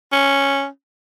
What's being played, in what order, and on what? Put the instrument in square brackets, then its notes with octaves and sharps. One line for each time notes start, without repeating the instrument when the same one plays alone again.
[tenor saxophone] C#4